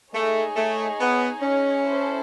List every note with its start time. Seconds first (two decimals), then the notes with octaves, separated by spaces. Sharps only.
0.13 A3 D#4 G#4 C#5
0.56 A3
0.99 B3
1.41 C#4
1.83 E4 A4 C5